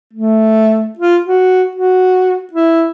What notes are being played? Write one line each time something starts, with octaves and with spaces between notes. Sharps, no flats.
A3
F4
F#4
F#4
E4